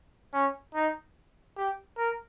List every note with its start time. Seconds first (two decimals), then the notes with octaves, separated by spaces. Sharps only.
0.33 C#4
0.75 D#4
1.56 G4
1.97 A#4